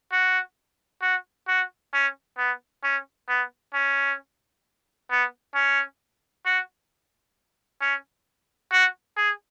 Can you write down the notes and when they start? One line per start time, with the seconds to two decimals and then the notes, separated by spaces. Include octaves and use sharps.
0.12 F#4
1.02 F#4
1.48 F#4
1.94 C#4
2.38 B3
2.84 C#4
3.29 B3
3.74 C#4
5.10 B3
5.55 C#4
6.46 F#4
7.81 C#4
8.72 F#4
9.17 G#4